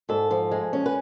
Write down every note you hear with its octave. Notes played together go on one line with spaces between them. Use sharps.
G#2 A4
F3
G#3
C#4
B4